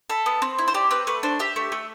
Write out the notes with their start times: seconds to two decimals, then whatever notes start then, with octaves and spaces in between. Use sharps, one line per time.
0.10 A4 B5
0.26 B3
0.42 C4
0.58 E4
0.68 C5
0.74 G4 D5
0.91 C4 B4
1.07 A3 B4
1.23 D4 C5
1.39 G4 E5
1.56 A3
1.72 A3